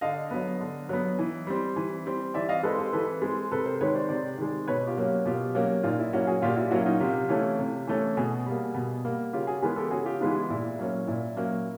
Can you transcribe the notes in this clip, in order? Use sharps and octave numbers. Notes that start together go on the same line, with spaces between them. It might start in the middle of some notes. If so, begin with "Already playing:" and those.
D3 D#5 F5
F#3 B3
D3
F#3 B3
E3
G3 C4
E3
G3 C4
E3 D5 E5
D#5 F5
G#3 C4 A4 B4
G4 A4
E3 A4 B4
G#3 C4
C3 A4 B4
A#4 C5
D#3 G#3 B4 C#5
C5 D5
C3 C5 D5
D#3 G#3
B2 B4 C#5
F4 G4
F#3 A#3 C#4
B2 F4 G4
F#3 A#3 C#4
A#2 D#4 F4
E4
F#3 A#3 C#4 E4 F#4
F#4 G#4
A#2 F4 G4
E4 F#4
F#3 A#3 C#4 E4 F#4
D#4 F4
C3 F4 G4
E3 A3 C#4
C3
E3 A3 C#4
B2 F#4 G#4
G3 A#3
B2
G3 A#3
C#3 F4 G4
F#4 G#4
E3 G#3 B3 G#4 A#4
G4 A4
C#3 F#4 G#4
F4 G4
E3 G#3 B3 D#4 F4
E4
A#2 E4
F#3 A#3 C#4
A#2 E4
F#3 A#3 C#4